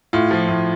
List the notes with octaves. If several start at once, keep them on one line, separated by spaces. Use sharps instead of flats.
A2 F4
F3
A2